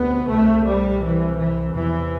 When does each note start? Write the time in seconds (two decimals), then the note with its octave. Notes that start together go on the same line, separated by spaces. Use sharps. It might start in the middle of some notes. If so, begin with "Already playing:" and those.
Already playing: D2 C3 B3
0.28 C2 C3 A3
0.65 G3
1.01 E3
1.37 E3
1.73 E2 C3 E3